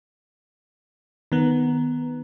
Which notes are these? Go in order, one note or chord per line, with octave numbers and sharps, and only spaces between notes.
D#3 B3